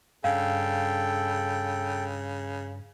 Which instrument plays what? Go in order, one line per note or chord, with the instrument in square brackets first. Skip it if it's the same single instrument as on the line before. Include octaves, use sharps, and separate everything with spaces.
[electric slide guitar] G2 D4 [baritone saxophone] C#3 [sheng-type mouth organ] A4 G5 [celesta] F5